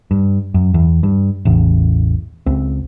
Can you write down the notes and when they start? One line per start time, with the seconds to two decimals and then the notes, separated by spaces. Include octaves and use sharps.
0.11 G2
0.54 F#2
0.74 E2
1.03 G2
1.45 A1 E2
2.46 C#2 C4